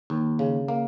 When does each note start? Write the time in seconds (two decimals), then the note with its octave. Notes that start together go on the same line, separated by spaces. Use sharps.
0.10 D#2
0.39 C#3
0.68 A#3